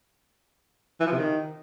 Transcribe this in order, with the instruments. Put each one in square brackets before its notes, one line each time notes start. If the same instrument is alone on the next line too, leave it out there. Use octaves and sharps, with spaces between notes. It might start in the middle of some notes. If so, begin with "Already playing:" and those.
[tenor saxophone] E3
F3
C3
D#3